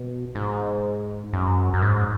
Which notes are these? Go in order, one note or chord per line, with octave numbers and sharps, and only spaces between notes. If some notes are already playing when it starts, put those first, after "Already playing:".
Already playing: B2
G#2
F#2
F#2
G#2